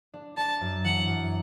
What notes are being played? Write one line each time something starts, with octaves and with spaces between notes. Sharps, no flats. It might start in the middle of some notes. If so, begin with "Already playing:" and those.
D4
D4 A5
F#2
E3 F#5
F#2